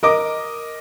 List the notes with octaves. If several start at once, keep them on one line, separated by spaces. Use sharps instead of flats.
A#4 D#5 D6